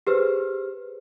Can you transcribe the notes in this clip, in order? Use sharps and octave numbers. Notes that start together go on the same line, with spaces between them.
G4 G#4 B4 C5 F6